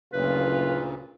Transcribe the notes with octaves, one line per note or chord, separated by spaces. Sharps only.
F#1 D2 A#2 C#3 A3 F4 B4